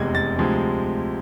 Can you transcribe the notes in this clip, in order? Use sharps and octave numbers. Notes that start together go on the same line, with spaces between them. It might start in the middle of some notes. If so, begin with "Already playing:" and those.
Already playing: F1 E2 C3 G#3 G#6
A6
D2 C3 F3 G#3